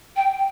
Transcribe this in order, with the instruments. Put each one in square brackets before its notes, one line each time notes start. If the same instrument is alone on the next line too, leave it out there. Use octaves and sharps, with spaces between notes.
[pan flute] G5